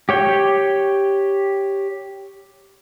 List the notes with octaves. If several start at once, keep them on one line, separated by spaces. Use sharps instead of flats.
G4 C#5 G5